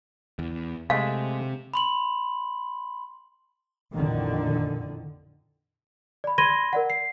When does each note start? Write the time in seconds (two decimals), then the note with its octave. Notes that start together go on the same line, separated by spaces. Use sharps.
0.39 E2
0.90 C3 G#3 A3 F5
1.74 B5 C6 F#7
3.92 A1 F2 A#2 D3 D#3
6.24 D5 B5
6.38 B5 C6 G#6 A#6 D#7 G7
6.73 A#4 D5 F#5
6.90 C7